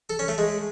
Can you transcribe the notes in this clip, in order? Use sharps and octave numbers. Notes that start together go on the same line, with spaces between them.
A4
C#4
A3
G#3